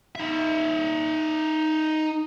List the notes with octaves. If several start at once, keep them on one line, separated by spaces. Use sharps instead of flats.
D#4 E5